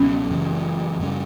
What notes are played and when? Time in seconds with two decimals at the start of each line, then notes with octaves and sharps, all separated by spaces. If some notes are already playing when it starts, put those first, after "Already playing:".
Already playing: C#2 B2 F#3 C#4
0.29 F#1 F#2 C#3 E3
0.99 F#2 C#3 G3 C#4